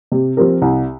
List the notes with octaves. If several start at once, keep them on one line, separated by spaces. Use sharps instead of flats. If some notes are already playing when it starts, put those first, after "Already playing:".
C3
F3 C4 G4 A#4
C2